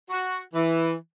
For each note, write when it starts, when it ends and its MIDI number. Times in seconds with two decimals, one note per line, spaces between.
0.10 0.38 66
0.54 0.92 52